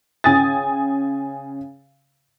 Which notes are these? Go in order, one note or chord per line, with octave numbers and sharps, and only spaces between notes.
C#3 G5 G#5 D#6 A6